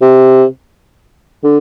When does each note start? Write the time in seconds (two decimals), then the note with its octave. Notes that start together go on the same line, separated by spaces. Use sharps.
0.02 C3
1.44 D3